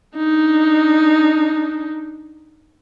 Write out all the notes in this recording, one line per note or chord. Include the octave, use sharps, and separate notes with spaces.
D4 D#4